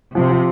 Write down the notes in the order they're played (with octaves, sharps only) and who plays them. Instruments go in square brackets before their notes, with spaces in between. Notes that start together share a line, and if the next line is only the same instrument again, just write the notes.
[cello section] C3 [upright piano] F3
[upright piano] F3